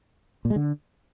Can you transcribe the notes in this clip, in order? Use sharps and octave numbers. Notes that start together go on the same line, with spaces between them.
A#2
G#3
D3